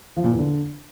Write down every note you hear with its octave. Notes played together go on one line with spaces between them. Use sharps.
F3
A#2
E2
D3